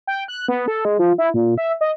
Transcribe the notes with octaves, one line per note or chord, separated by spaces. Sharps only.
G5
F#6
B3
A4
G#3
F3
E4
A#2
E5
D#5